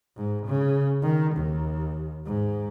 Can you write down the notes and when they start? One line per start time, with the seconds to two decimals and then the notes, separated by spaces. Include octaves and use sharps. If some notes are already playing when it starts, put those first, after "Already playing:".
0.16 G#2
0.47 C#3
1.02 D#3
1.35 D#2
2.26 G#2